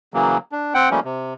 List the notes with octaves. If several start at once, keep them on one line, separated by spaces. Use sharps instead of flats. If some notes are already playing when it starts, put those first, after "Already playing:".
C#3 E3 F#3 A#3
D4
C4 F#5 G5
F3 G3 A3 A#3 C#4
C3